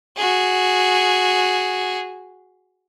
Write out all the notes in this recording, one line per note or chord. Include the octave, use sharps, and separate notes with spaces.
F#4 G#4